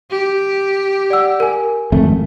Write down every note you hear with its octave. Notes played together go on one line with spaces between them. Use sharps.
G4
D5 F#5 E6
A#4 G#5
G#1 F2 A3